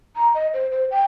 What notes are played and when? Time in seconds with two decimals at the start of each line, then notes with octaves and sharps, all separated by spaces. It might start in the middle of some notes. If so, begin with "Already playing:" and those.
0.16 A#5
0.34 D#5
0.54 C5
0.71 C5
0.91 G5